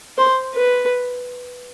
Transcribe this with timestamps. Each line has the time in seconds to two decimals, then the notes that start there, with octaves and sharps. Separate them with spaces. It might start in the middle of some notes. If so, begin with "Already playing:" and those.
0.18 C5
0.54 B4